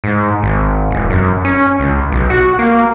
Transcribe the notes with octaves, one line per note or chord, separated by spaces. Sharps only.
G#2
G#1
E1
F#2
C#4
C#2
B1
F#4
A#3